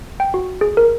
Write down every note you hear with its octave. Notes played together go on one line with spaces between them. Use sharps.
G5
F#4
G#4
A#4